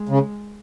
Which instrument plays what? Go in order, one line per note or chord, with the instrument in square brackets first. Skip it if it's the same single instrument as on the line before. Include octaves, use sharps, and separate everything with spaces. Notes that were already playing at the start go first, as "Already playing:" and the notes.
Already playing: [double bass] G#3
[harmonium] C#3